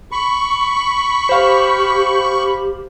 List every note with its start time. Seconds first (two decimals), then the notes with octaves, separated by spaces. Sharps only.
0.11 B5 C#6
1.29 G4 C5 F5